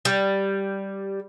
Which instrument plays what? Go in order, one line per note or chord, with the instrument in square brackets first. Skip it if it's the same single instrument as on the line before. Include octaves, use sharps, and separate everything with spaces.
[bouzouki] G3